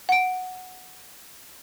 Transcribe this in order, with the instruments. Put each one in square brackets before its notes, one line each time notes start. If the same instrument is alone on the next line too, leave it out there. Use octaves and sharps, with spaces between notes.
[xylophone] F#5 D7